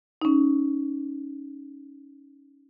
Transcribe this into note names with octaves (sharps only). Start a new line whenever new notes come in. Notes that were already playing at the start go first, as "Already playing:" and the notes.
C#4 D#4